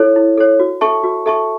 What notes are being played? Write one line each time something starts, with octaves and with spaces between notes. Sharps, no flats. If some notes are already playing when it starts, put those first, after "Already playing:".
Already playing: E4 A4 C#5
E4
A4 C#5
F#4
A4 E5 A5 C#6
F#4
A4 E5 A5 C#6